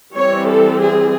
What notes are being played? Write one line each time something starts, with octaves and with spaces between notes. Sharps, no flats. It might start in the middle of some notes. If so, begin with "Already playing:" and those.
E3 G3 C4 C#5
A4
G#4